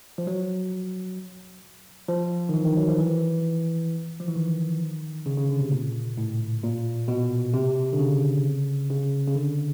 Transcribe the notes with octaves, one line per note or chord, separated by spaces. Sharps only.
F3
F#3
F3
D#3
E3
D#3
F#3
F3
E3
F3
E3
D#3
C#3
C#3
D3
C3
A#2
A2
A#2
B2
C3
D3
C#3
C#3
C#3
D3